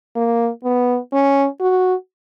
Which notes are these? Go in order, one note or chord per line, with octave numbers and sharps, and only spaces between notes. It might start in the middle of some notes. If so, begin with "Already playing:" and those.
A#3
B3
C#4
F#4